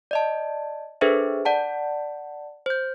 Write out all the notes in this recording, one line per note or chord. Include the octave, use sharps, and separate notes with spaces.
D5 D#5 A5
D4 G#4 A4 B4 C5 E5
D5 F#5 A5
C5 G6